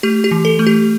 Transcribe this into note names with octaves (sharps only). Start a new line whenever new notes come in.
A3 G4
G4
E3
A4
A3
G4